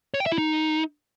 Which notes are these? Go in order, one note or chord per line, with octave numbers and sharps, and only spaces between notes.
C#5
G5
E5
E4
D#4